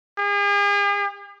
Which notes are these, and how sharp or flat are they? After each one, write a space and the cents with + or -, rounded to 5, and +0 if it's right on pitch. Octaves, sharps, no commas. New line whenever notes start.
G#4 -45